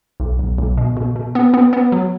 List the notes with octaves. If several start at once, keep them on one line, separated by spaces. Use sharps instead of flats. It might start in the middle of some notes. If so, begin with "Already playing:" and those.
B1
B1
B1
B2
B2
B2
B3
B3
B3
F#3